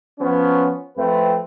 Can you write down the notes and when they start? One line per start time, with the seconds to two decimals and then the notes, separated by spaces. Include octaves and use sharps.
0.19 F3 B3 C#4
0.96 F2 A3 C4 B4